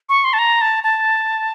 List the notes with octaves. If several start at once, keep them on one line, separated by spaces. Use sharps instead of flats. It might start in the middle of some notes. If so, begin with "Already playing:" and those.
C#6
C6
A5
A#5
A5
A5